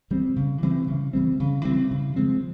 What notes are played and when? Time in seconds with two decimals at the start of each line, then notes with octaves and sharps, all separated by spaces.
0.11 E3 G3 C4
0.36 C#3
0.63 E3 G3 C4
0.88 C#3
1.13 E3 G3 C4
1.40 C#3
1.64 E3 G3 C4
1.91 C#3
2.16 F3 G#3 C4